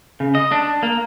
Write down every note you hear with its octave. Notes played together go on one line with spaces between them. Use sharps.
C#3
D#5
D4
A#3